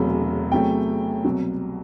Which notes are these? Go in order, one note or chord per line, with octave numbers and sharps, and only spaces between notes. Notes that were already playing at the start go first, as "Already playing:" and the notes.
Already playing: E1 E2 C3 F#3 A3
E2 C3 F#3 A3 G5
C2 B2 F#3